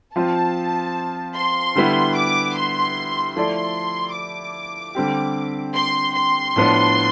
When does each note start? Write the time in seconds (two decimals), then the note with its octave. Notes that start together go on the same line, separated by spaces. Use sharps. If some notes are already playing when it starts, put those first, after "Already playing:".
0.15 F3 C4 F4 C5 A5
1.36 C6
1.75 D3 G3 B3 E4
2.16 D6
2.56 C6
3.36 F3 A3 E4 A4 D5 C6
4.16 D6
4.95 D3 G3 C4 G4
5.75 C6
6.15 C6
6.56 A2 F3 B3 D4